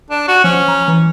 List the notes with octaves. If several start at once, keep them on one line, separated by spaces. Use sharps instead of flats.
D4
F#4
F3 C#4
A#5
E3